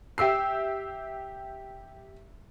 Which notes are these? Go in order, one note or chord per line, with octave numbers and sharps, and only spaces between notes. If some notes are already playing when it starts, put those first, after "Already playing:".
G4 E5 E6 C7